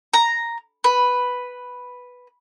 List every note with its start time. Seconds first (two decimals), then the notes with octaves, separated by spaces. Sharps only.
0.14 A#5
0.84 B4